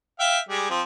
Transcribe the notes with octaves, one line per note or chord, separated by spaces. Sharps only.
E5 F5 G5
G3 G#3
F3 C4